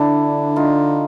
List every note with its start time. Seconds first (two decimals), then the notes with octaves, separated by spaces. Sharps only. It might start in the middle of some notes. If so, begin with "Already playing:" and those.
Already playing: D3 D4 E4
0.56 D#4 F4